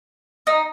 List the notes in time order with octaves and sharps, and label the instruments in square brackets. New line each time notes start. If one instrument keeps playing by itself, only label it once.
[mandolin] D#4